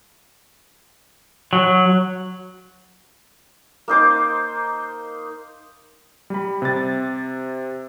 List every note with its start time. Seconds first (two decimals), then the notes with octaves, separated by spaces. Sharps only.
1.53 F#3
3.88 A#3 D#4 C5 D6
6.30 G3 B5
6.62 C3 A6